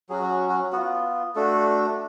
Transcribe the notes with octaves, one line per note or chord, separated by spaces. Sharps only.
F#3 C#4 F#4 G#4
F#4
F#4
B3 F4 F#4
A3 D4 F#4 A4